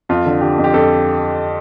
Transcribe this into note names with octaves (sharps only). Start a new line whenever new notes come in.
F2 F4
D3
D3 G4
F2
G4
F2 A4